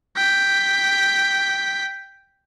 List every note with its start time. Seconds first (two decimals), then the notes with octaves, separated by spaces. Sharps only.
0.17 G5 B6